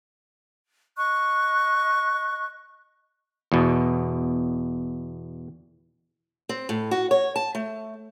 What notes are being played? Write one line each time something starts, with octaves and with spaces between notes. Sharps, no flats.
D#5 C#6 F#6
E2 B2
C4
A2
F#4
C#5
A5
A3